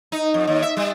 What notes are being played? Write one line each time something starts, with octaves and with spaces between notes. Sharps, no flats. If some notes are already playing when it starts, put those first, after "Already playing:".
D#4
F2
D#2
E5
G3